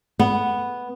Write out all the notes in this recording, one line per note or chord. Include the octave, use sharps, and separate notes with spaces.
B3